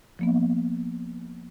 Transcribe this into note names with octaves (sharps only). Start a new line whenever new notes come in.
F3 A#3 B3